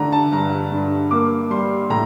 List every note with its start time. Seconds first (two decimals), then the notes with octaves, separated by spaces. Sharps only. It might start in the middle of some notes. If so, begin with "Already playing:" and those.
Already playing: D3 A3 A#5
0.12 A5
0.32 G2 A#5
0.72 G2
1.11 A#3 D6
1.50 G3 C6
1.90 A2 A#5